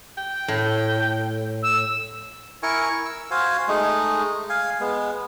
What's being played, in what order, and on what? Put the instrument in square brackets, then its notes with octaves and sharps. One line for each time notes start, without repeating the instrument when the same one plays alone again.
[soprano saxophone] G5
[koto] A2
[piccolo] E6
[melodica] E4 A#4 G#5 C#6
E6
F#4 C5 F5 G#5
G#3 A3 D#4
F5 G#5
G#3 B3